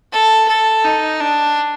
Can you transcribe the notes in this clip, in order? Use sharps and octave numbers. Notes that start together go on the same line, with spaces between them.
A4
A4
D#4
D4